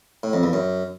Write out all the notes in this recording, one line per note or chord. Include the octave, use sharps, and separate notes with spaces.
A2
F2
E2
F#2